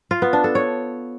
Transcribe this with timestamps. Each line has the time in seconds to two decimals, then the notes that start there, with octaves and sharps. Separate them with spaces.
0.11 F4
0.22 B3
0.33 D4
0.44 A4
0.55 C#5